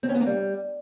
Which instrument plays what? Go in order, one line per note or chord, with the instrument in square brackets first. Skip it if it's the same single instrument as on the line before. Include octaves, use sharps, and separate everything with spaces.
[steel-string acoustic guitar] C4
C#4
B3
A#3
G3